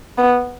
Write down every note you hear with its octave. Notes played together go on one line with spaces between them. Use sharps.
B3